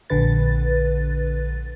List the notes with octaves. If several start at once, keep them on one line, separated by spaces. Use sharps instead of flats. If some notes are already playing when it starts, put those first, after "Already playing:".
A#1 D3 B4 A6